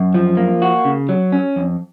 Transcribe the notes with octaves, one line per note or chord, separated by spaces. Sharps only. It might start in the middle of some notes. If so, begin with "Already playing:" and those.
Already playing: F#2
F3
A#3
F#4
C#3
F#3
C#4
F2